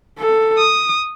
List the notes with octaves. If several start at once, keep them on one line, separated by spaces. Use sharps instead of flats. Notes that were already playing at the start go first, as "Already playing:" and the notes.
A4
D#6